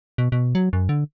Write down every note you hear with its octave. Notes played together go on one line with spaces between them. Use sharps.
B2
B2
F#3
F#2
D3